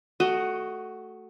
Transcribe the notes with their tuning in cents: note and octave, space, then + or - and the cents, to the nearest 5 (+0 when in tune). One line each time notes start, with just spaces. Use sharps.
A3 +0 F#4 +10 D#5 +0